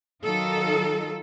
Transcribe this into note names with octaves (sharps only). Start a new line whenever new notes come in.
D#3 F#3 D#4 F4 A4